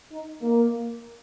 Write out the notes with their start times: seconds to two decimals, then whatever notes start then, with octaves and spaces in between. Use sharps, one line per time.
0.12 D#4
0.42 A#3